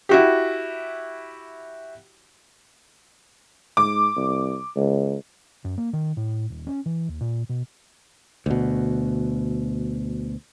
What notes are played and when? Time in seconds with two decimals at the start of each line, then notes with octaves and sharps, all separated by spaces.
0.09 E4 F#4 G4
3.77 G#2 D6
4.16 C2
4.76 C#2
5.64 F#2
5.78 A#3
5.93 D#3
6.17 A2
6.50 D#1
6.67 C#4
6.86 E3
7.09 D#2
7.20 A#2
7.49 B2
8.46 D2 B2